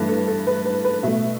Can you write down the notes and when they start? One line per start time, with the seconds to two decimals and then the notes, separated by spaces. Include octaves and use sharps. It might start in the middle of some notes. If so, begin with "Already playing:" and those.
Already playing: G2 E3 A3 B4
0.09 A4
0.28 A4
0.47 B4
0.65 B4
0.85 B4
1.03 B2 A3 E5